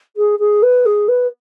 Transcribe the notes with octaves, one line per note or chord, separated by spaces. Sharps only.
G#4
G#4
B4
G#4
B4